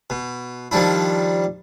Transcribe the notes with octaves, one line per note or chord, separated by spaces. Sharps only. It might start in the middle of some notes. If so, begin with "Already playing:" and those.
B2
D#3 F3 G3 D4 E4